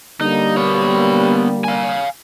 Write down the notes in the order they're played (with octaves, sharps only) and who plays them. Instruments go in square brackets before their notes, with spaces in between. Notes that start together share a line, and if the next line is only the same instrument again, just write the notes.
[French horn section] D3 G3 A#3 [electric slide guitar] D#4
[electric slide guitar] B3 C#5
F5 G#5